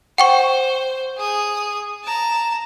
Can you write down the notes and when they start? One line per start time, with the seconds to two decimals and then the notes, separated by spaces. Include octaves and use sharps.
0.18 C5 F#5 G5 C#6
1.17 G#4 D#6
2.04 A5 A#5